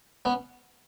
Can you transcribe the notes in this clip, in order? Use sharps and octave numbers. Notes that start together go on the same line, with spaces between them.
B3 C#4